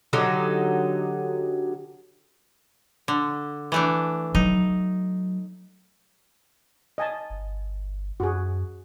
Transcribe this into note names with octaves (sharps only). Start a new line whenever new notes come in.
D3 F#3 D#4 G4
D3
E3 A3 D4
F#3 D#4
D#5 G#5 A5
G1
F#2 F#4 G#4